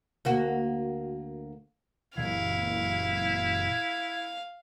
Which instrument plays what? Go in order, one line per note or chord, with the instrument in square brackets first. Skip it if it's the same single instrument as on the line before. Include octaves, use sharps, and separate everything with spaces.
[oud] D2 A#3 F#4
[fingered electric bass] F#1 A#2 E3 [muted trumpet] E4 [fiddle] F5